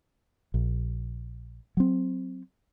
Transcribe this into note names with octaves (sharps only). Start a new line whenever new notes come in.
A#1
F#3 C4